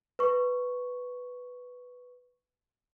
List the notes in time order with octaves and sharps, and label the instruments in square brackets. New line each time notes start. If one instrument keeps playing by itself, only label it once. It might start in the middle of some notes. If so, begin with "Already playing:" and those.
[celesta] B4 C#6